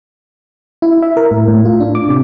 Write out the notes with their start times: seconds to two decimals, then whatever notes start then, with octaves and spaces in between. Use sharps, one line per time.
0.82 E4
1.02 E5
1.17 A#4
1.31 A2
1.48 A2
1.65 F4
1.80 D4
1.95 D6
2.09 C3